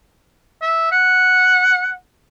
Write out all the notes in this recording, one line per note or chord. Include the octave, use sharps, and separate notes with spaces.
E5
F#5